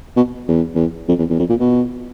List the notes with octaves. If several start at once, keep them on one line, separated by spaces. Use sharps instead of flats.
B2
E2
E2
F2
E2
E2
F2
A#2
B2